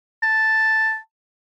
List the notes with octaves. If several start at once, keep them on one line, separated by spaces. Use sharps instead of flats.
A5